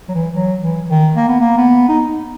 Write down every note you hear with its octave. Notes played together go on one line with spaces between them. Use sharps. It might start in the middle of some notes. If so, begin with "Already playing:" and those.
F#3
E3
F#3
E3
D#3
A#3
B3
A#3
B3
D#4